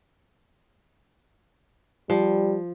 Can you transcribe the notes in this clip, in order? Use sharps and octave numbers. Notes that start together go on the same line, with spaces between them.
F3 G3